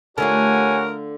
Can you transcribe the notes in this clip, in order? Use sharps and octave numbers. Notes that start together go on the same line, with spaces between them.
D3 A3 F4 G4 A#4 C#5 F#5 G#5